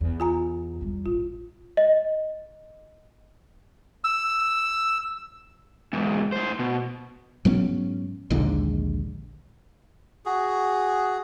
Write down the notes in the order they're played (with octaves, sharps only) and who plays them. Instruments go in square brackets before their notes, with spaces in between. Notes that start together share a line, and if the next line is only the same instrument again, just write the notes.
[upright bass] E2
[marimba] F4 G#5 A#5
[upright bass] E2 G3
[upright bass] A1 [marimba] F4
[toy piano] D#5
[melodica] E6
[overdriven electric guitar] E2 G#2
A2 C5
B2
[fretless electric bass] G#2 F#3 B3 C#4
A#1 D#2 G#2 D3
[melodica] F#4 G#4